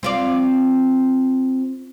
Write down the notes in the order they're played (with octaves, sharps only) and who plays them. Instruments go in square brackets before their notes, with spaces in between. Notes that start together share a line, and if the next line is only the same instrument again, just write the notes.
[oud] C4 F4 D5